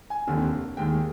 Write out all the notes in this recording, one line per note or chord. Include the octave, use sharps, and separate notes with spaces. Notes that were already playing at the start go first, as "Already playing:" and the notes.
G#5
F1 D#2 D3
D#2 D#3 G#3 G5